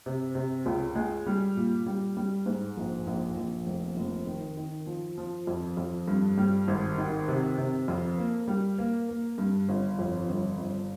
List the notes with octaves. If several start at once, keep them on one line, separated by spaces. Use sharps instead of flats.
C3
C3
C#2
G#3
G3
A#2
G3
G3
G#2
A#1
A#1
A#1
F1
F1
D#3
D#3
F3
F3
F2
F2
G2
G3
G#1
D#3
C3
C3
F2
A#3
G3
A#3
A#3
G2
G1
F2
G1
G1